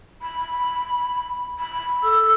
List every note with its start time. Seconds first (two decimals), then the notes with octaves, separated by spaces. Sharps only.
0.22 B5
1.59 B5
2.04 A4 E6